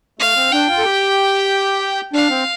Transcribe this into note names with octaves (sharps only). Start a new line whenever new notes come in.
A3 F5
C4
D4 G5
F4
A4
G4
D4 F5
C4